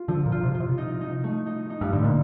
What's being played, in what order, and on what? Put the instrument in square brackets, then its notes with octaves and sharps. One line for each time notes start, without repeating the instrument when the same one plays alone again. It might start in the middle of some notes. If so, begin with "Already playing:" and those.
Already playing: [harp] F4
[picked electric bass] D3 [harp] F3
[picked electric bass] A#2
[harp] F4
[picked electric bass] C3
[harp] F4
[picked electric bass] C3
[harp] D#4
D#4
A3
D#4
D#4
[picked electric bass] G2
[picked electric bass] A2 [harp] D3
[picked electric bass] A#2